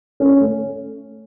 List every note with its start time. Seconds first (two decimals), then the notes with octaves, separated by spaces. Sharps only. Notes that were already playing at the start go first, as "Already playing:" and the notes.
0.20 C#4
0.40 A3